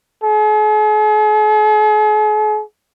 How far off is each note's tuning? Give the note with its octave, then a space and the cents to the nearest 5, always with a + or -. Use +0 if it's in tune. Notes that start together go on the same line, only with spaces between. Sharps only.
G#4 +45